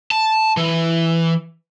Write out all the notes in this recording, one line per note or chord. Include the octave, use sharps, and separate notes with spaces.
A5
E3